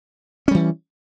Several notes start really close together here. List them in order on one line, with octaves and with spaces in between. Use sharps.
C#4 G3 E3